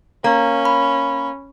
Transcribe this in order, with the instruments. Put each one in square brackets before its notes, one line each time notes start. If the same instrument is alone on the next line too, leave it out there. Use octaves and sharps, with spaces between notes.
[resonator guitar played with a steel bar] A#3 [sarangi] C#4
[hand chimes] B5